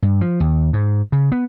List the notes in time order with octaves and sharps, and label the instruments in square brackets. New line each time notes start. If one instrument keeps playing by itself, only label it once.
[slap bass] G2
F3
D#2
G#2
C#3
B3